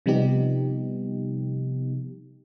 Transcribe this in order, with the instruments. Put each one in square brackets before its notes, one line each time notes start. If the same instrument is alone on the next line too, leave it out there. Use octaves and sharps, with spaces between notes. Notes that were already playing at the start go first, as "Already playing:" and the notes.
[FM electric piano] C3 F3 G3 B3 D#4 G4